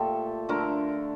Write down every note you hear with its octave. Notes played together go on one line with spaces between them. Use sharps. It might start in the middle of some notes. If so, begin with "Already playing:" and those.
Already playing: A#2 F3 A3 G4 A4
D3 F3 A3 A#4